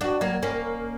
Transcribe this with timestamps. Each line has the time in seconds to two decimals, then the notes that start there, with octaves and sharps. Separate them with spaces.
0.01 D4 F#4
0.21 F#3 A#3
0.42 A#3 C#4